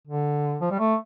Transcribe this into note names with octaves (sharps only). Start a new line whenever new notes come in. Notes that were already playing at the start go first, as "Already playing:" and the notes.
D3
F3
G3
A3